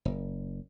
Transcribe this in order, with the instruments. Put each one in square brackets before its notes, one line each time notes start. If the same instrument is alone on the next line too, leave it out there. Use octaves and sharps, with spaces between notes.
[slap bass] F#1